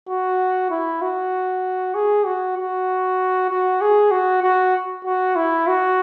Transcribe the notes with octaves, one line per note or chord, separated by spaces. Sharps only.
F#4
E4
F#4
G#4
F#4
F#4
F#4
G#4
F#4
F#4
F#4
E4
F#4